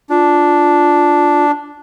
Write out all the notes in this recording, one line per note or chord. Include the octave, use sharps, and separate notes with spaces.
D4 F4